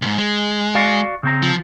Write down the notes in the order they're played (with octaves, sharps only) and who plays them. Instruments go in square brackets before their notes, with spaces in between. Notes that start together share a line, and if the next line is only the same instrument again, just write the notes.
[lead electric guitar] D2 G#2
G#3
[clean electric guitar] F#4 D5 F5
C#3 C4 A#5
[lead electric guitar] F3